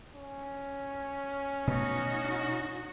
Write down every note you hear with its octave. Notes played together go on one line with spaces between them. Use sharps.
C#4
B2 A3 D#4 F#4